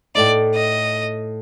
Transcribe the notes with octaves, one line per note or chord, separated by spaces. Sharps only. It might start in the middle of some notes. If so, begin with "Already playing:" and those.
A2 A3 D#4 D5
D#5